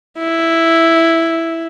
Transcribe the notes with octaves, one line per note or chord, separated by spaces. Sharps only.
E4